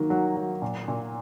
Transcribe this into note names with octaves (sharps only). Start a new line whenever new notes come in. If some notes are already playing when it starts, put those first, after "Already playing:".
Already playing: D#3 F#3 A#3
F#3
F#3
A#2
A#2